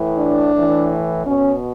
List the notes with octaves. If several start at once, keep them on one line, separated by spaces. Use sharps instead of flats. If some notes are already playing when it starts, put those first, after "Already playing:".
Already playing: A2 E3
D4
A2 E3
B2 C#4